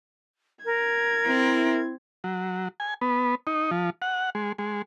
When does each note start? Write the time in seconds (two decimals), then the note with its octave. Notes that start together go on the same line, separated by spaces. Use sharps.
0.65 A#4 G#6
1.27 C4 E4
2.24 F#3
2.80 G#5
3.01 B3
3.47 D#4
3.71 F3
4.02 F#5
4.35 G#3
4.58 G#3